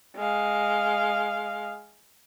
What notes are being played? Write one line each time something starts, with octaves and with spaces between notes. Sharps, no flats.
G#3 F5